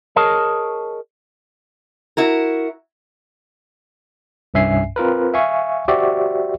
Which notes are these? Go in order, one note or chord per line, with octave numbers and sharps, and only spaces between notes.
G#4 A#4 C#5 D#5 A5
E4 F#4 A#4
C2 G2 C#4 E5 G#5 C7
C4 F4 A#4 B4
E5 F5 G#5 C#6
F#4 G4 C5 D5 E5